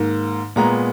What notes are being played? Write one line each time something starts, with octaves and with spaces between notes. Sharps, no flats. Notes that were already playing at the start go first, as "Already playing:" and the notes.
Already playing: G#2 D#3 A#3
A#2 G#3 B3 A#5